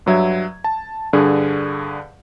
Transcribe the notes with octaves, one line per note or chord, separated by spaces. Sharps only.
G2 F#3 E5 G#6
A5
G2 D3 G#4